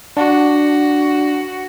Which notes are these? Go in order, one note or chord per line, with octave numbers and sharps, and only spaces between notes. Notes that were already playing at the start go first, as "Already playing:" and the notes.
D4 F#4